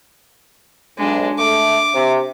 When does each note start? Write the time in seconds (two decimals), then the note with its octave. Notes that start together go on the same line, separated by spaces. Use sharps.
0.98 B1 G#3 D4
1.39 A3 D6
1.94 C3